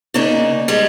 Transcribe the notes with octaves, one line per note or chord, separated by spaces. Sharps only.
C#3 A#3 D4 D#4
G3 G#3 B3